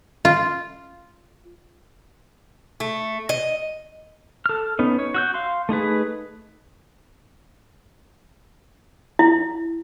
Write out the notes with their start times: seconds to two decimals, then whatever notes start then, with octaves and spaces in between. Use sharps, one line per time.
0.25 F4
2.80 A3
3.29 D#5
4.46 A4 F6
4.79 B3 C#4 D#4
4.99 C#5
5.14 F#4 E6 G6
5.34 F5 C6
5.69 A3 D#4 G#4 B4
9.19 E4